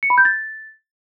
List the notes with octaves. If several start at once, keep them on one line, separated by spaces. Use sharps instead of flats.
C#7
B5
G6
A6